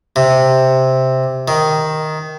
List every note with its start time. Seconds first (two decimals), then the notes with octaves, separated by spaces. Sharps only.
0.16 C3
1.48 D#3